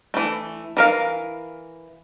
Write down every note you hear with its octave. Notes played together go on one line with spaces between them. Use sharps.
E3 A3
E3 A#4 F5